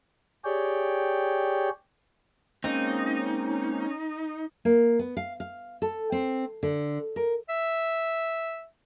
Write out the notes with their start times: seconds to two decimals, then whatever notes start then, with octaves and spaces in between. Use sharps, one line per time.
0.44 G4 G#4 C#5 D5 G5
2.64 G#3 A#3 C4 C#4 D#4
4.65 A#3
4.99 B3
5.17 F5
5.40 F5
5.82 A4
6.12 C4
6.63 D3
7.16 A#4
7.49 E5